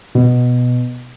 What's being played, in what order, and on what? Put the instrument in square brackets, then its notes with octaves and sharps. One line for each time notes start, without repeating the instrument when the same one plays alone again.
[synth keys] B2